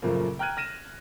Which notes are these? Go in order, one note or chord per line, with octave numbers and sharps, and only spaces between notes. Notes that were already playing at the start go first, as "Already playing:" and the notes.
F#2 A#2 C#3 F3 A3 A#3
G5 A#5 F6 F#6 G#6 D#7
F6 A#6 D#7 E7